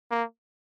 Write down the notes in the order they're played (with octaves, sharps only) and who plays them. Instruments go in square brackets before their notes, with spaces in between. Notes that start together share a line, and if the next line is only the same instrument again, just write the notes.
[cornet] A#3